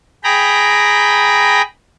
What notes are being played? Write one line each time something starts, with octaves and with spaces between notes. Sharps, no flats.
G#4 G5 A#5 B5